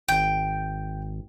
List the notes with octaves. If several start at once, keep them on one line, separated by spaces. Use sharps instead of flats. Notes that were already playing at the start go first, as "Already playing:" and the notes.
G#1 G5